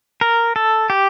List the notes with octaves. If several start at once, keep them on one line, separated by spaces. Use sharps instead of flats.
A#4
A4
G4